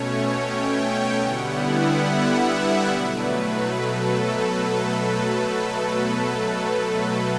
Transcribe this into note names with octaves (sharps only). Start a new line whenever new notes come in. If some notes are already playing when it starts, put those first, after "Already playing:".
Already playing: B2 A3 C#4 C#5
G5
D3 G3 B3 E4 F#5
F#5
E5
D5
B2 F#3 A3 B4
A4